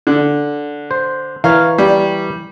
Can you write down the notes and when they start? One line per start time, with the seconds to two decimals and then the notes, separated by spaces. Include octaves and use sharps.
0.07 D3
0.91 C5
1.44 E3 A#4 C#5 F5
1.78 G3